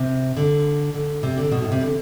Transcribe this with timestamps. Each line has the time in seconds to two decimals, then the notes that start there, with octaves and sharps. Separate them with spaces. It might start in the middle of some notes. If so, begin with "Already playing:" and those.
Already playing: C3
0.37 D3
0.94 D3
1.23 C3
1.38 D3
1.51 B2
1.62 A2
1.72 C3
1.81 D3